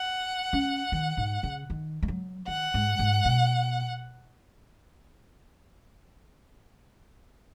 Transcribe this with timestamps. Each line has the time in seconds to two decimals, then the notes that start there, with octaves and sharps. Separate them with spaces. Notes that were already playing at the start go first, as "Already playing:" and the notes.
Already playing: F#5
0.53 C#4
0.92 D#3
1.17 G#2
1.43 C#3
1.70 D#3
2.03 G#3
2.08 F#3
2.48 D#3 F#5
2.74 G#2
2.99 G#2
3.25 B2